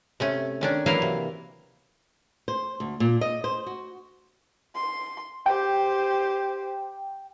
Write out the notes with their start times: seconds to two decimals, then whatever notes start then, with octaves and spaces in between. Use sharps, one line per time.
0.20 C3 A3 C#4
0.61 D#3 C#4 D4
0.86 E3 F#3 A#3 E4 A#4 F5
1.02 C3
2.48 C5
2.80 D2
3.00 A#2
3.21 D#5
3.44 C5
3.66 F#4
4.76 C6
5.46 G4 C5 G5